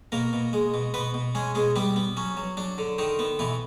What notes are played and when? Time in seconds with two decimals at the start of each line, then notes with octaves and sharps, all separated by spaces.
0.12 B2 A#3 A#4
0.33 B2
0.53 G#3
0.74 B2
0.94 B2 B3 B4
1.14 B2
1.35 G#3 C#4 G#4
1.55 B2 G#3 G#4
1.76 G3 B3 G4
1.96 B3
2.17 F#3 C#4
2.37 F#3
2.57 F#3 D4
2.78 D3
2.98 D3 D#3 D#4
3.19 B3
3.39 B2 E3 E4